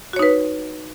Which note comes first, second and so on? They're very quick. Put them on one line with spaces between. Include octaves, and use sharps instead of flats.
F#4 C#5 D#4 B4